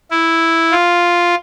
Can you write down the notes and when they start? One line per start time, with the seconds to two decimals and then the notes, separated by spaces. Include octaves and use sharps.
0.11 E4
0.72 F4